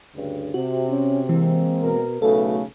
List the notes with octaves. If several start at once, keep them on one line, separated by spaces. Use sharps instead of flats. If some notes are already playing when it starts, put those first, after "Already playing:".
D2 G2 C#3
C3 F#4
C#4
E3 G#3 A#3 C4
B2 A#4
B1 C#3 A3 F#4 A4 B4